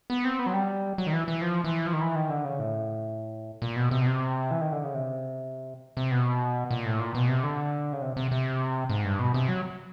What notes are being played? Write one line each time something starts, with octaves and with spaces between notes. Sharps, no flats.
B3
C4
B3
F#3
G3
F#3
D#3
E3
E3
F3
E3
F3
D#3
E3
D#3
D3
C#3
A2
A#2
B2
C3
B2
C3
E3
D#3
D3
C#3
C3
C3
B2
A#2
A2
A#2
B2
C3
D3
C#3
C3
C3
C3
G#2
G2
B2
C3
F#3